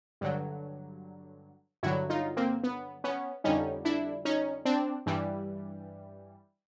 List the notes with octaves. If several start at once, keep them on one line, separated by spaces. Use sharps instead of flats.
G2 D3 F#3
G2 D3 F#3 E4 F#4
D#4 F4
A#3 C4
B3
B3 C#4
F2 D3 G3 C#4 D#4
D4 E4
C#4 D#4
C4 D4
G2 E3 G3